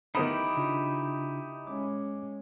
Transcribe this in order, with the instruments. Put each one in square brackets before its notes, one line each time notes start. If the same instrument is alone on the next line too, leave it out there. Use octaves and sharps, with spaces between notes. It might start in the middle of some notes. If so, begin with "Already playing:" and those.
[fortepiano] D#3 B3 B5 [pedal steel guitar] D#4 E4 G4
[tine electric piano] C#3 D4 F4
[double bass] G#3 C#4 [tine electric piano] D6